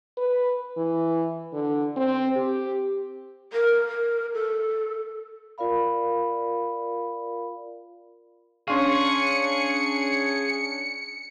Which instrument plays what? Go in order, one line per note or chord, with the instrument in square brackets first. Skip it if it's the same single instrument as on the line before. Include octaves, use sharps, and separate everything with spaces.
[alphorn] B4
E3
D3
C4
G4
[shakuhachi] A#4
A#4
A4
[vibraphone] F4 A#4 D5 F5 B5
[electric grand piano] C#4 D4 F5 [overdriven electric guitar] G#4 [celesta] C6 C#6 [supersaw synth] C#7